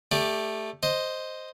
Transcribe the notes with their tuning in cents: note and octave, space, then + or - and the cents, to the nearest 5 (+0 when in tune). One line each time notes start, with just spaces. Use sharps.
A3 +0 G4 +10 D5 +0
C5 +0 D#5 +0